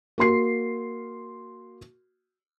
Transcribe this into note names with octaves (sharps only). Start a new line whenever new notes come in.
A#3 F#4 C6 C7